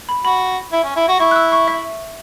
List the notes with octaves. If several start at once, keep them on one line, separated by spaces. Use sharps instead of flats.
B5
F#4 B5
E4
C#4
E4
F#4
E4 C#6
F#6
E6
C#6
E5